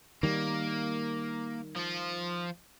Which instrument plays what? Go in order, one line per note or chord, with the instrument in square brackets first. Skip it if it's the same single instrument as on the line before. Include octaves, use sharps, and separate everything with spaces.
[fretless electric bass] D#3 G3 [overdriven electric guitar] A#3
[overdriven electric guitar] F3 F4